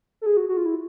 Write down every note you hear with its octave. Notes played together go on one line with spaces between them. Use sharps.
A4
G#4
F#4
F#4
F4
E4